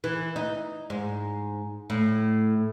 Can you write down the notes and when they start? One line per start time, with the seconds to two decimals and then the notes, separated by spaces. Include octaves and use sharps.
0.04 E3
0.36 D#4
0.90 G#2
1.90 A2